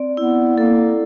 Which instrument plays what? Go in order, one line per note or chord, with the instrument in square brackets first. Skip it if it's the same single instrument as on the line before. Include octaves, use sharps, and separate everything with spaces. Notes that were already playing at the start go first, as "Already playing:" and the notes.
Already playing: [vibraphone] C4 D5
[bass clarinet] B3 [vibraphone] E4
[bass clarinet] A#3 [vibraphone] A4